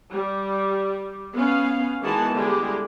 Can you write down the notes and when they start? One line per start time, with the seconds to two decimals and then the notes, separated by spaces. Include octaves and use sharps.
0.11 G3
1.35 B3 C#4 F5
2.01 D#3 E3 G#3 B3 F#4 A5
2.32 D3 G3 G#3 E4 G4